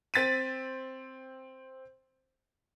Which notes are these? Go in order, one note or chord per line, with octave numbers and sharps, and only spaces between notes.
C4 A6 B6 D#7